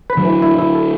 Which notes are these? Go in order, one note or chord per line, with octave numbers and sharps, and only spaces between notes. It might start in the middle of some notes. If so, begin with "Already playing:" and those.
B4
D3 F#3
E3
E4
E4
A4